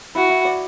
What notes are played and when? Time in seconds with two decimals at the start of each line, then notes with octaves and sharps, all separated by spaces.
0.15 E4 F#4
0.30 E4
0.45 D5